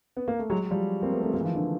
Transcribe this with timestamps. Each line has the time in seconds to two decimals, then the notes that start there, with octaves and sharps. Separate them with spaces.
0.17 B3
0.28 A#3
0.39 A3
0.50 F#3 G#3
0.70 F3 G3
1.02 A#3 C4
1.12 A3 B3
1.23 A3 B3
1.34 G#3 A#3
1.41 E3
1.45 D#3 F3
1.55 D3 E3